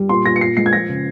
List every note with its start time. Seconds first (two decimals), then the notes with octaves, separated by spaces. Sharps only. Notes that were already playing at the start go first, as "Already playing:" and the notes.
Already playing: G3
0.09 A#2 C6
0.25 A#2 A#6
0.36 C#7
0.41 A#2 C7
0.57 G#3 C7
0.66 G#6
0.73 F3 A#6
0.89 C#3